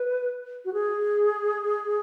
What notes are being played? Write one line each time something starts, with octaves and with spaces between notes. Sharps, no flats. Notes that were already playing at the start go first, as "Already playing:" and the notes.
Already playing: B4
F#4
G#4